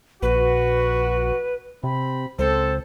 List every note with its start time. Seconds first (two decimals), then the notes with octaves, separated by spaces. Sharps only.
0.22 A#1 F#4 B4
1.83 C3 C4 B5
2.39 C#2 C4 A4 C5